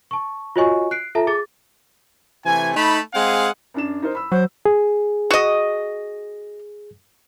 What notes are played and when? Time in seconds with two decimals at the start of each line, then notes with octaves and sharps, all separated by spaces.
0.11 A5 C#6
0.56 F4 F#4 C#5 D#5 G#5 C#6
0.91 F#6 C7 D7
1.15 F4 A4 E5 A5 A#5
1.27 G#4 D6 A6
2.45 C3 E3 A3 G#5
2.75 A3 D#4 A5 B5
3.14 G#3 C4 G#4 F5 F#5 G#5
3.74 F#2 D4 E7
4.02 D#4 A#4 C5
4.14 B5 E6
4.32 F#3 C5
4.66 G#4
5.31 F#4 D#5